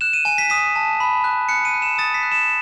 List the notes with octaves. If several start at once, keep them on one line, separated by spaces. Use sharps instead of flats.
F#6 E7
D#7
G#5 D#7
B6
D#6 B6
A5
B5
F#6
F#6 C#7
D#7
F#6
E7
D#6 A6
B6
F#6
E7